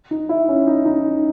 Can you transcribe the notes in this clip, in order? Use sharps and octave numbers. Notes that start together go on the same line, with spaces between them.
D#4
E4
C#4
D#4
D#4